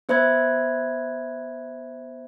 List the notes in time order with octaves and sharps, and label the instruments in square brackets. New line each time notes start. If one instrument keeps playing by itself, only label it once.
[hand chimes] B3 C5 E5 B5 G#6